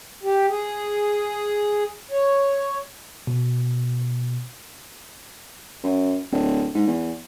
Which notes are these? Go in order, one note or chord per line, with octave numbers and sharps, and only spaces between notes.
G4
G#4
C#5
B2
F#2
D1
G#2
E2